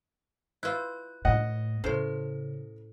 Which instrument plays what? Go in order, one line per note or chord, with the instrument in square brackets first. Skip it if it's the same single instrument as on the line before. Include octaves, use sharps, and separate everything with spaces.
[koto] E4 F4 [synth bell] B4 F#6
[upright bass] A2 [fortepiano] D#5 F#5
[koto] A2 C5 [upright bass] C#3 [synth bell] C#4 A4